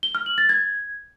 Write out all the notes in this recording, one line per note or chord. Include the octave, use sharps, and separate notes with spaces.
G7
F6
F#7
A6
G#6